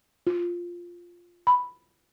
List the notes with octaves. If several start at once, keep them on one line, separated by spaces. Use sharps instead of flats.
F4
B5